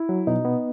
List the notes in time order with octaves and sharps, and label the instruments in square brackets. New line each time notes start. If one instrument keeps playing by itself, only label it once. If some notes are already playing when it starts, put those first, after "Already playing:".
Already playing: [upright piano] E4
[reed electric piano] F#3
[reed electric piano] B2 [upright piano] D#4
[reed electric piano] B3